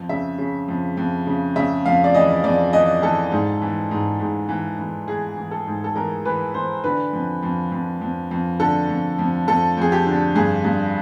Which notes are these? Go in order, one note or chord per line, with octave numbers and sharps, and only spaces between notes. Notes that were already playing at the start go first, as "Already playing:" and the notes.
Already playing: F2
C#3 E5
C#3
F2
F2
C#3
C#3 E5
F2 F5
D5
E3 D#5
F2 D5
E3 D#5
E3 A4
G#2
E3
G#2
G#2
E3
E3
E3 G#4
E3
A4
G#2
A4
E3 A#4
E3 B4
E3 C5
D3 B4
F2
F2
F2
F2
F2
D3 A4
F2
F2
F2 A4
F2 G#4
G4
D3
G2 G#4
G2